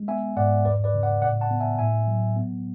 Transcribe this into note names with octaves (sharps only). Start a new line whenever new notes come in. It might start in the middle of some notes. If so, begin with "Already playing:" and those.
Already playing: G#3
B3 E5 G#5
G#2 D5 F#5
E2 B4 D5
B4 D5
C#3
D5 F#5
A2 D5 F#5
F#5 A5
B3
E5 G#5
A2 E5 G#5
F#3
B3